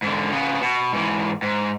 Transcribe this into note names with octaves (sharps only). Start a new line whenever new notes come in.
G#2 D3
C#3 B3
B2
G#2 E3
G#2